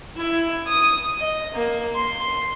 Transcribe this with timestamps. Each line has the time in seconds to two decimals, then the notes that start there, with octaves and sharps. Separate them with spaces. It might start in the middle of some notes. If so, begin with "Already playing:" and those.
0.17 E4
0.67 D#6
1.19 D#5
1.54 A#3
1.95 C6